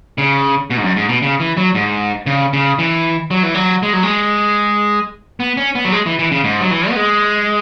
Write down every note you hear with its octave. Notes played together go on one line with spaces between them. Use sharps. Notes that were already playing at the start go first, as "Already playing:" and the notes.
C#3
B2
G#2
F#2
G#2
B2
C#3
E3
F#3
G#2
C#3
C#3
E3
F#3
E3
F#3
G#3
F#3
G#3
B3
C#4
B3
F#3
G#3
E3
E3
C#3
G#2
F#3
E3
B3
G#3